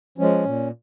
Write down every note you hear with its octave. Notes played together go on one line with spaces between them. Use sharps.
F3 G#3 C#4
A#2